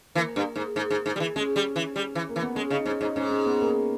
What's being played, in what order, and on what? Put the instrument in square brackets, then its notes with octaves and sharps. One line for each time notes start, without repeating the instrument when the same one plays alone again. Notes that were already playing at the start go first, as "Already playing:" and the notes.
[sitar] E3 [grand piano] A#3
[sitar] G2
G#2
G#2
G#2
G#2
G3
E3
[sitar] G#3 [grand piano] C#4
[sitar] G3
E3
G3
E3
[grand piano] A#3
[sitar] E3
[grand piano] B3
[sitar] G#3 [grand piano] C#4
[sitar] C#3 [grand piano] D#4
[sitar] G#2 [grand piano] C#4
[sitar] G#2 [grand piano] D#4
[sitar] G#2 [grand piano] C#4
[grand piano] C#4
B3
A#3